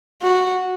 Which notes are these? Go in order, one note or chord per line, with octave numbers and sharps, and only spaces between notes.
F#4